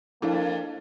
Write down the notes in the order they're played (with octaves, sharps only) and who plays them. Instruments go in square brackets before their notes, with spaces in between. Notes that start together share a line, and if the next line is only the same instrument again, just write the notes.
[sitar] F2 [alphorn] A#3 [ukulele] D4 A4 [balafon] E4